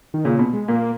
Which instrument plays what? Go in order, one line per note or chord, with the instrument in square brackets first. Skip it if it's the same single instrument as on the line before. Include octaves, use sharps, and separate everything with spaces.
[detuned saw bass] D#3
[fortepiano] A#2 [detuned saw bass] C#3
[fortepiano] B2
[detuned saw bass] G#3
[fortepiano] A#2 [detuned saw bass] A#3